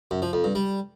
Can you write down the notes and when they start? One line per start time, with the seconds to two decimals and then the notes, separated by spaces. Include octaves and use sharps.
0.11 F#2
0.22 F3
0.33 F2
0.44 G2
0.55 G3